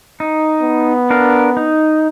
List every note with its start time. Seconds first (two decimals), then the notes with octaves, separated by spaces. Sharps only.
0.20 D#4
0.62 B3
1.10 D4 A#4 F5
1.57 D#4